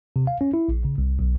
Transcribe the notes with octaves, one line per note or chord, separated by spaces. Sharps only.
C3
F5
C#4
E4
A#1
C#3
C2
B1